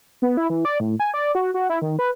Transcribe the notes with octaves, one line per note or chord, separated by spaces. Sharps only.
B3
E4
E3
D5
A2
G#5
D5
F#4
F#4
E4
D#3
B4